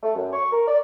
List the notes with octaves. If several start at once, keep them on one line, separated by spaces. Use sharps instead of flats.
A3
F#2
C#6
A#4
D5